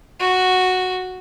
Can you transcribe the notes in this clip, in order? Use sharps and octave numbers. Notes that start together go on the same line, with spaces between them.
F#4